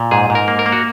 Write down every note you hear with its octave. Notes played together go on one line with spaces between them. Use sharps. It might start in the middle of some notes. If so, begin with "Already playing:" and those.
Already playing: A#2
G#2 G#4
G#2
A#4
A#3
A#4
A#3
F#4